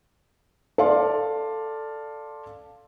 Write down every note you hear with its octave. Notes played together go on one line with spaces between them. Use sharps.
A4 D5 F5 C6